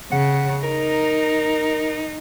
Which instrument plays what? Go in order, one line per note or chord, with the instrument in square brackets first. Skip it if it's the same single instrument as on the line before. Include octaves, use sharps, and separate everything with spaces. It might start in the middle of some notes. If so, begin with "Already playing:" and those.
[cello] C#3 [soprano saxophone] F#5
[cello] D#4 [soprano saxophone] A#4